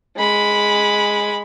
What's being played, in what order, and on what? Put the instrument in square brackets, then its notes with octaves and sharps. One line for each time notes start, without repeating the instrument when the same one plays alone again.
[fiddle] G#3 B5